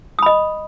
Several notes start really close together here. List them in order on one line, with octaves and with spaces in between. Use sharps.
D#6 B5 D#5